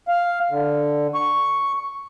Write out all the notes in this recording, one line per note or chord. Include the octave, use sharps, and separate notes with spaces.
F5
D3
C#6